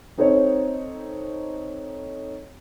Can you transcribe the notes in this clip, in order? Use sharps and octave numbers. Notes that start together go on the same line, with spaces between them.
C4 D#4 A4 C5 C#5